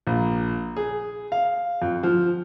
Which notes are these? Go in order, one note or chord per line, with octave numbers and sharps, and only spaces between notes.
A#1
G#4
F5
F2
F3